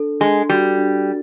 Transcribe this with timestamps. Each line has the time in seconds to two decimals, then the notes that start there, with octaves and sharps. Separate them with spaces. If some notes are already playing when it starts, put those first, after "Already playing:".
Already playing: D4 A4
0.20 G#3 D4
0.49 G3 F#4
0.78 D4